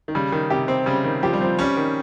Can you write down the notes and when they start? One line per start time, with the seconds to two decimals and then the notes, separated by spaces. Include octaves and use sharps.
0.08 D#3
0.15 C#3 G3
0.32 D#3
0.50 C3 G4
0.68 C4
0.86 C#3 G3
1.04 D#3
1.23 F3 G4
1.33 G3
1.41 F3 C4
1.59 G3 C#4
1.77 D#3